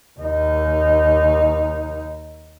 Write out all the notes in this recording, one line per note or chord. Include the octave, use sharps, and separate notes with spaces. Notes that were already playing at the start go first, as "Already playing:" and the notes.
D#2 D#4